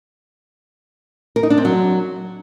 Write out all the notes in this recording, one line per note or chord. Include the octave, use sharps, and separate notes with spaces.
A#4
D#4
D4
C4
F#3